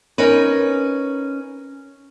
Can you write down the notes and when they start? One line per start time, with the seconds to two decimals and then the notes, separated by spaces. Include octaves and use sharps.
0.18 C#4 D#4 A#4 B4